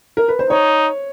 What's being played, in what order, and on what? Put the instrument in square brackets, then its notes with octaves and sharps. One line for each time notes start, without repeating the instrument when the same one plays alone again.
[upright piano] A#4
B4
C5
[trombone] D#4 [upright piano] C#5